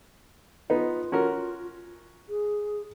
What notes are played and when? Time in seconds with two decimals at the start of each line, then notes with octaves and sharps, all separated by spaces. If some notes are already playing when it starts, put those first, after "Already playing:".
0.70 B3 D#4 F4
1.12 C#4 F#4 A#4
2.29 G#4